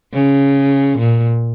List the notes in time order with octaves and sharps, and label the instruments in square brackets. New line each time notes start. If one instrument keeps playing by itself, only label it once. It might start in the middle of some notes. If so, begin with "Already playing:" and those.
[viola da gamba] C#3
A#2